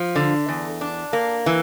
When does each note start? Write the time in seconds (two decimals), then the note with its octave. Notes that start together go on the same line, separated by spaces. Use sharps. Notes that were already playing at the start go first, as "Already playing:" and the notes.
Already playing: F3
0.16 D3
0.48 E2
0.81 D4
1.13 A#3
1.46 E3